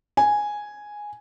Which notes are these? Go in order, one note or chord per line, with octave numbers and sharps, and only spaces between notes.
G#5